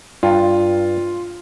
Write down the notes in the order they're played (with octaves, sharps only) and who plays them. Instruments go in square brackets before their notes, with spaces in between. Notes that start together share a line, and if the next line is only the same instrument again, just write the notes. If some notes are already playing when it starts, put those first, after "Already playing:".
[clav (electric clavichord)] G2 [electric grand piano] F4